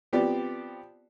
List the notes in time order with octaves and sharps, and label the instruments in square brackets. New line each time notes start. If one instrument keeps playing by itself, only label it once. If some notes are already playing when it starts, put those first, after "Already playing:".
[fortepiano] F3 B3 C4 G4 D5